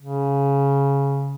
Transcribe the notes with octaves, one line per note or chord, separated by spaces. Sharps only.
C#3